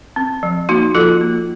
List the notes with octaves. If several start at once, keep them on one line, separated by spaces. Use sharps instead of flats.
C4
F3
A#3 D#4 F#4
F3 F4 A4
A#3